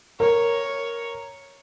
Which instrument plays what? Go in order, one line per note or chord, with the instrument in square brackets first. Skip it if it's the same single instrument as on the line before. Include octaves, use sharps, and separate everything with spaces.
[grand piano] A#4 [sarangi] C#5